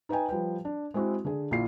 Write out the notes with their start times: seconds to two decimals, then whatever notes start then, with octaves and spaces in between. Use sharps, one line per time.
0.09 D#4 B4 D#5 G5 G#5
0.29 F3 G3 B4 G5
0.65 D4
0.94 G#3 C4 E4 F#4
1.25 D3 G#4
1.51 A#1 E4 F4 C7